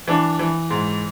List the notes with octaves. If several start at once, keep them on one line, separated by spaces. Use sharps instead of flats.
E3 D4
E3
G#2